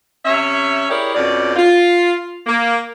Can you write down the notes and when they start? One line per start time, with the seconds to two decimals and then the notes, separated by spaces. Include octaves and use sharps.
0.25 C3 C#4 C#5 E5
0.89 E4 G4 G#4 A#4 C#5 D5
1.15 F2 B2 C#4 D5
1.56 F4
2.47 A#3